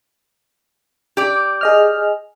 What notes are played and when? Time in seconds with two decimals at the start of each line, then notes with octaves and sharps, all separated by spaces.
1.17 G4 D5
1.61 G#4 D#5 F6